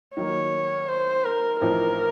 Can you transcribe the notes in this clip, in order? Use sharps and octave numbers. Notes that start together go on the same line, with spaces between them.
D#3 F#3 A#3 C#5
C5
A#4
A1 A2 F3 C4 D#4 A#4